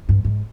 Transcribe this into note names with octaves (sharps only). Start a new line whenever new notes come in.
G2
G#2